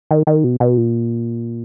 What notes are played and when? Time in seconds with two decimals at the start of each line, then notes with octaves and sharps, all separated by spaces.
0.11 D#3
0.27 D#3
0.44 B2
0.60 B2
0.77 A#2